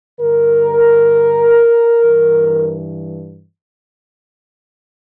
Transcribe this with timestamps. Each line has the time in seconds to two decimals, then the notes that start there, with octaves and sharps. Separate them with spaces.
0.20 G2 D3 A#4
2.01 G2 E3